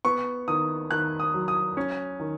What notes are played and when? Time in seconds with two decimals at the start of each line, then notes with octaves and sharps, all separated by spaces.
0.05 B3 C#6
0.48 D#3 D#6
0.90 D#3 F#6
1.20 D#6
1.34 F#3
1.48 D#6
1.77 C#4
2.20 D#3